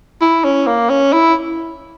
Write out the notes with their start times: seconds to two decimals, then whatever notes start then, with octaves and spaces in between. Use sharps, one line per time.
0.21 E4
0.44 C#4
0.67 A#3
0.90 C#4
1.13 E4